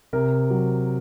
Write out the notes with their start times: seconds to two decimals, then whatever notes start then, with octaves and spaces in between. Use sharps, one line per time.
0.13 C3 A#4
0.50 F#3